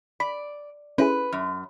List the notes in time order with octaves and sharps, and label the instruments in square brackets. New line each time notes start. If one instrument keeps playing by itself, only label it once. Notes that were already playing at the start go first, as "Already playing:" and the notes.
[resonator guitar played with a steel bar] D5 [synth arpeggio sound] B5
[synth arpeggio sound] C#4 E4 G#4 [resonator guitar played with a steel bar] B4
[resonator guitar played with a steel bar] F#2